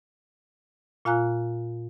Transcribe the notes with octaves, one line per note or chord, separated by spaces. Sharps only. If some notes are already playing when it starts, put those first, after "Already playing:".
A#2 F4 F5 G#5 A#5 F#6